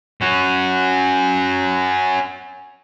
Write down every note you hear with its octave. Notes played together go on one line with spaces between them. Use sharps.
C#4 F#4